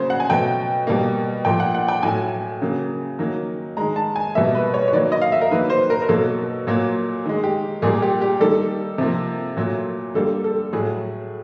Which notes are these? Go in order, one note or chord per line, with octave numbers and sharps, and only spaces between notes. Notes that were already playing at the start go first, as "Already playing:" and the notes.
Already playing: C#3 F#3 A#3 C5
F#5
G#5
B2 F#3 A3 G5
B2 G3 A#3
A#2 F3 A3 G5
F#5
F#5
G5
A2 F#3 A3 G#5
C#3 F#3 A#3
D#3 F#3 A#3
D#3 G#3 A#5
A5
G#5
B2 G3 A#3 E5
B4
C#5
C#5
D#3 F#3 A#3 D5
D#5
F5
E5
A#4
D#3 F#3 A#3 B4
C5
A#4
A#4
B2 F#3 A#3 A4
A#2 F#3 A#3
D#3 G#3
G4
A#2 G3 A#3 G#4
G4
G4
D#3 G3 A#3 A4
C3 F3 A#3
A#2 F#3 A3
D3 G3 A#3 A4
A4
A2 F#3 A3 G#4